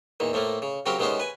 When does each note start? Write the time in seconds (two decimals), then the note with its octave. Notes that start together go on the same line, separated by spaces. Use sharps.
0.20 E2 A#2 D#3
0.33 A2 F3 A3 A#3
0.62 C#3
0.86 C#3 F#3 C4 G4 A#4
0.99 C3 D#3 G#3 B3 C#4 C5
1.20 B4 G#5